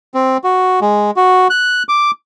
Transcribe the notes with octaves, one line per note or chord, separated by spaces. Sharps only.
C4
F#4
G#3
F#4
F#6
D6